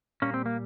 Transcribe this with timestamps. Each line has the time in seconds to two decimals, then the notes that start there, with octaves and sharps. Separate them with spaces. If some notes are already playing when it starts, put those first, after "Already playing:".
0.22 A#2 G3 A#3 C#4
0.34 C4
0.46 A#3